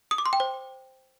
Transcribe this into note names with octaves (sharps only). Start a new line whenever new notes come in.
D#6
D6
C6
G5
C5